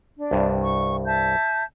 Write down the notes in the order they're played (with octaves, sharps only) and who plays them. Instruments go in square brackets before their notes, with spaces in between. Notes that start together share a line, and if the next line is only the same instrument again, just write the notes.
[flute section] D4
[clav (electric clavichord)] C2 G2
[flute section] C#6
E5 A5 G6